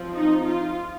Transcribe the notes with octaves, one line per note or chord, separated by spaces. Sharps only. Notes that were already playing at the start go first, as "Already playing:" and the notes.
Already playing: F3 C4
D#4
F4